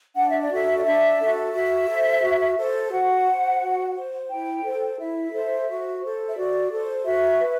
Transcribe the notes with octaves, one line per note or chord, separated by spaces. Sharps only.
D4 F#5
E5
D5
F#4 A4 E5
D5
D4 E5
F#4 A4
F#4 E5
A4 C5
F#4
A4 C5
F#4 F#5
C5
F#4
C5
E4 G5
A4 C5
E4 E5
A4 C5
F#4
A4 C5
E5
F#4 D5
A4 C5
F#4 E5
B4